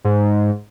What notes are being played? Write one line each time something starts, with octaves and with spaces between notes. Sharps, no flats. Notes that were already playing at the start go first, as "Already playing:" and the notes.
G#2